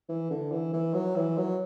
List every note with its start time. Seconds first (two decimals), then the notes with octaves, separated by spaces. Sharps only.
0.09 E3
0.31 D3
0.52 E3
0.73 E3
0.94 F#3
1.16 E3
1.38 F#3